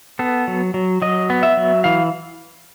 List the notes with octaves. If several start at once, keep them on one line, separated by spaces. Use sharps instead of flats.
B3 A4
F#3
F#3
F#3 D#5
B3
E5
F#3
E3 F5